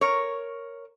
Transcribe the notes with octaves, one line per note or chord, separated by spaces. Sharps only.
A#4 C#5